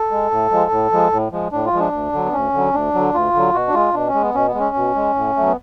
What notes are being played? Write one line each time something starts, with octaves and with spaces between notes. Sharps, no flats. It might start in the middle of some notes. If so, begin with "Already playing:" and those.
Already playing: A4
G#3
A2
F3 G#3
A2
F3 G#3
A2
F3 G#3
A2 D4
F4
F3 G#3
D4
D2
D3 F#3
B3
D2 C#4
D3 F#3
D2 D4
D3 F#3
D2 F4
D3 F#3
B2 F#4
D4
G#3 F4
B2 D4
C#4
G#3
B3
B2 C#4
B3
G#3
C#4
B2
G#3
A2
F#3 A3
B3